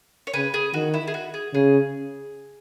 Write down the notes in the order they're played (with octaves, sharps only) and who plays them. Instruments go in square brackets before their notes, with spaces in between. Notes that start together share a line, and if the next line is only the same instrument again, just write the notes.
[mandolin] C#5
[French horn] C#3 [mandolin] G#4 B4
[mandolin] G#4
[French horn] D#3 [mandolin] F#4
[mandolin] E4
G#4
F#4
G#4
[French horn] C#3 [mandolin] G#4